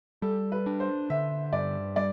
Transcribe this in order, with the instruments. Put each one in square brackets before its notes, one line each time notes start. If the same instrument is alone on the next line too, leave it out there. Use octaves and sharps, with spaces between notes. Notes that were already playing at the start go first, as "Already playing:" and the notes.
[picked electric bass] G3 [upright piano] A4
[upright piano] B4
[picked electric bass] D4
[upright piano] C5
[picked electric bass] D3 [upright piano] E5
[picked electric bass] G2 [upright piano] D5
[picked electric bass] G3 [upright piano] D5